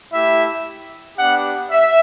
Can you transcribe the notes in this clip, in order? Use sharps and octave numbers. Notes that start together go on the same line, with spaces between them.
A3 E4 G4 E5
B3 D4 G4 F#5
E5